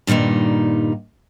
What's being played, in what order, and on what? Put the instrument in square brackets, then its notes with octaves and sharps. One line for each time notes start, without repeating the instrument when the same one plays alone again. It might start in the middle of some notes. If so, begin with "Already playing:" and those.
[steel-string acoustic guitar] G2 A#2 D#3 G3 D#4